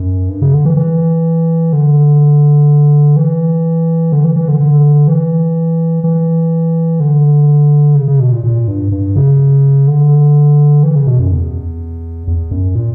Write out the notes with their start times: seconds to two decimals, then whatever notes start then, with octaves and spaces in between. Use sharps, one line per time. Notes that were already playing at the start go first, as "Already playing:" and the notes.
Already playing: F#2
0.29 G2
0.42 C#3
0.54 D3
0.65 E3
0.77 E3
1.73 D3
3.16 E3
4.12 D3
4.24 E3
4.36 E3
4.48 D3
4.60 D3
5.08 E3
6.04 E3
7.00 D3
7.95 C#3
8.08 C#3
8.20 B2
8.32 A#2
8.44 A#2
8.68 G2
8.92 G2
9.16 C#3
9.87 D3
10.83 E3
10.95 C#3
11.07 B2
11.19 F#2
11.32 E2
12.27 E2
12.51 F#2
12.75 A#2